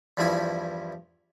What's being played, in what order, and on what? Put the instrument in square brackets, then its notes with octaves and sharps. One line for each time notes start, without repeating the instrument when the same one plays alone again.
[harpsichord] E2 G2 F3 G3 E4 G#5